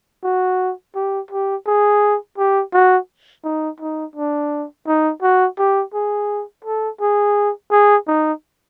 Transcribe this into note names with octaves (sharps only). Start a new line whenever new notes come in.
F#4
G4
G4
G#4
G4
F#4
D#4
D#4
D4
D#4
F#4
G4
G#4
A4
G#4
G#4
D#4